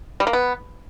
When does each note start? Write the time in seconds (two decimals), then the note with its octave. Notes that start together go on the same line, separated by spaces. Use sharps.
0.20 G3
0.27 A#3
0.33 B3